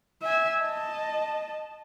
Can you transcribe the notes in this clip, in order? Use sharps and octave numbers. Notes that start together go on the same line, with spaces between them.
E5 G#5
D#5 A5